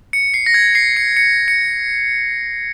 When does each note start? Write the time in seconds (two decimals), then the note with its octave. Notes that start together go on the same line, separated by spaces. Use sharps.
0.13 C#7
0.34 C7
0.46 A#6
0.54 G#6
0.75 C7
0.97 C#7
1.17 C#7
1.48 C#7